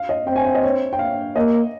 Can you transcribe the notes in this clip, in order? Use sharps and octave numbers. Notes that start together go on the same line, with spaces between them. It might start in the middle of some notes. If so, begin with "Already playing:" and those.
Already playing: F5
D#5
C4 G5
G#5
G5
D#5
C#5
G5
F5
A#3 D#5